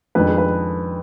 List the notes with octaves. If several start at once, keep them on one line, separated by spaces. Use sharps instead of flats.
F2 D#3 G#3 D4 B4
G#4
B4